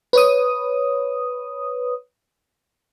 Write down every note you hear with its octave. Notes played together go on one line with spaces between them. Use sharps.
B4 C#5 D#6